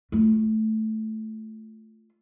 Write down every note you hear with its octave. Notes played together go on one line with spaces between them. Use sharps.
A3 F4